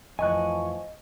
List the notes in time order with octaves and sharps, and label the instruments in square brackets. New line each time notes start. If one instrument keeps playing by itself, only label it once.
[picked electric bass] F2 A2 E3 [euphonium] F3 [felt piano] D#5 [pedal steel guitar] G#5 C#6 F#6